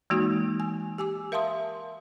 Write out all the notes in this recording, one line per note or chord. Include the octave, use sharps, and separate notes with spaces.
E3 G#3 A#3 D#4 F#4
G#5
G4 G#5 D6 E6
A#4 E5 F5 A5 C6 D#6